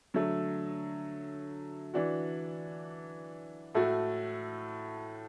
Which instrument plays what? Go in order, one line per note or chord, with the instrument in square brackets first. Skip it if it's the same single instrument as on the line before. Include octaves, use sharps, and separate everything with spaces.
[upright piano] D3 F#3 A3
E3 D4 F#4
A2 A3 F#4